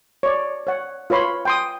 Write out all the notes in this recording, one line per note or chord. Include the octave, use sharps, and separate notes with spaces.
C#5 D5
C#5 F#5
F4 B4 C#5 B5 C6
G5 C6 D#6